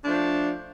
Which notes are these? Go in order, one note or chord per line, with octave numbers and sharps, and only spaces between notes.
F3 A3 D4